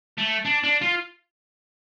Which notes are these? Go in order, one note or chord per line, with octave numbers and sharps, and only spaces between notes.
A3
D4
D4
F4